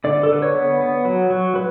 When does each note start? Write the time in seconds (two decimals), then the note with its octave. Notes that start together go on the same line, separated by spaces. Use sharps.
0.04 D3 D5
0.23 A4
0.30 D3 B4
0.42 C#5
0.55 B3
0.80 B3
1.05 F#3
1.30 F#3
1.56 B4